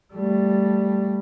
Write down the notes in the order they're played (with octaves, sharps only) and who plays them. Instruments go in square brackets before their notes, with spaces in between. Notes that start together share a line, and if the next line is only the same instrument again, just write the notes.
[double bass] G3 A3